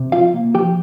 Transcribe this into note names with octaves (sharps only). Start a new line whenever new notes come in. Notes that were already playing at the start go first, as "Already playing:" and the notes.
Already playing: C3
F3 F4 F5
A#3
F3 G4 G5